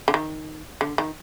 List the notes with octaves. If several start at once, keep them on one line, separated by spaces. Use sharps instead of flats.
D3
D#3
D3
D#3